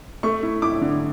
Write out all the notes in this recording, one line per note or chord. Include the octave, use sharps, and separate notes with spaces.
A3 C#6
E4
E4 D6
D3